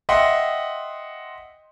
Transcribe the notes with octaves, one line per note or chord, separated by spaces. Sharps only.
D#5 E5 F#5 G5 C6